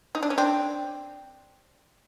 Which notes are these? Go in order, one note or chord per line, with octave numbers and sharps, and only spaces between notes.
D#4
D4
C#4
C4 D4